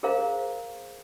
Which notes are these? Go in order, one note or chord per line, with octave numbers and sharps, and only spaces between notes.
G#4 A#4 C5 F5 A#5